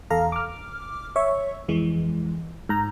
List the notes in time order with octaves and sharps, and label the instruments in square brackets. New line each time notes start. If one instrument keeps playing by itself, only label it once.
[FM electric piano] E2 A4 F5 A#5
D6 F6
C#5 E5 C#6
F2 E3 G#3
G#2 A#5